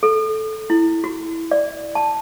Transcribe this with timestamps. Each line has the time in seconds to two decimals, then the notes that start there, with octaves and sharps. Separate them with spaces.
0.03 A4
0.70 E4
1.04 F#4
1.51 D5
1.95 A5